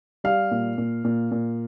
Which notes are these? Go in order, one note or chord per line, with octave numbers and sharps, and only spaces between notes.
G3 F5
A#2
A#2
A#2
A#2